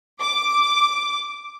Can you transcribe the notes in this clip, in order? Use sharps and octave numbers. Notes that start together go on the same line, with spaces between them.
D6